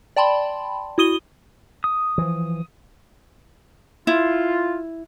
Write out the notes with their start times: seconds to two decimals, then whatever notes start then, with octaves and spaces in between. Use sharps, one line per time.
0.16 D5 G5 A5 B5 C6
0.98 E4 F#4 D#6 D#7 G7
1.84 D#6
2.18 E3 F3
4.07 E4 F4